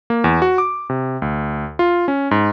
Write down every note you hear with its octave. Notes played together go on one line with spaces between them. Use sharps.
A#3
E2
F#4
D6
C3
D2
F4
C#4
G#2